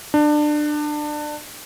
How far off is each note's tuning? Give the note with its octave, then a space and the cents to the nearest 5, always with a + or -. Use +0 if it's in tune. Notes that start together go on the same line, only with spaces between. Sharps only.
D4 +25